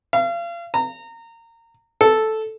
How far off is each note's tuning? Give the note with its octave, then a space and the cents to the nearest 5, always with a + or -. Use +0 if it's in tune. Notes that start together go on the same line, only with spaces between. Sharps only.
F5 -35
A#5 -25
A4 -5